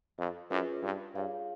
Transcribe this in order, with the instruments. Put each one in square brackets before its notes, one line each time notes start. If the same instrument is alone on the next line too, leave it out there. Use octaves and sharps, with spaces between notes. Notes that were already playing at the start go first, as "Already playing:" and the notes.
[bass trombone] F2
[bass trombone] F#2 [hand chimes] C#4 F4 G#4 B4
[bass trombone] G2
[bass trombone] G2 [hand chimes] F4 G#4 C#5 F5